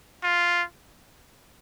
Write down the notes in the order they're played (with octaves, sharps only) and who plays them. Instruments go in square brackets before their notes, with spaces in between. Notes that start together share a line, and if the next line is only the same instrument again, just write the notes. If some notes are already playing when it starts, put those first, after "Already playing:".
[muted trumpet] F4